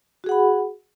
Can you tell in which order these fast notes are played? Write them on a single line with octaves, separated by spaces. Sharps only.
F#4 G#4 F#5 B5